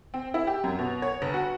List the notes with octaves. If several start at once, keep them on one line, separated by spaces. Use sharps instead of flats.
C4
E4
G4
F#2
B2
C#5
G1
F#4